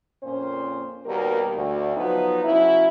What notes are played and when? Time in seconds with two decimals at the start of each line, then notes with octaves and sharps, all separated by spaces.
0.23 F2 A#2 C#4 C5
1.05 D#2 B2 G3 A#4
1.55 D2
1.96 F3 F#3 B3 D#4
2.43 C#3 F#3 E4